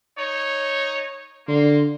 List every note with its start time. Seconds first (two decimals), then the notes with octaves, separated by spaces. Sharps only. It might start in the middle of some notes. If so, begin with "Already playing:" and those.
0.18 D#4 C#5
1.48 D3 A#3 C6